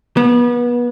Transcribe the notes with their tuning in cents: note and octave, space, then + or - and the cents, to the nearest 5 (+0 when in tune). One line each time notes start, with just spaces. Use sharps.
B3 -30